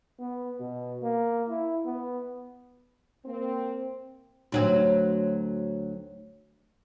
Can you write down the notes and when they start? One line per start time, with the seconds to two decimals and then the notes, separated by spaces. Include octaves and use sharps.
0.19 B3
0.60 B2
1.03 A#3
1.49 E4
1.86 B3
3.25 A#3 C4
4.52 D2 F#3 C4